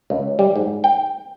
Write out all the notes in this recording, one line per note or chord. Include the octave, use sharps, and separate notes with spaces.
C#2
G3
G#2
G5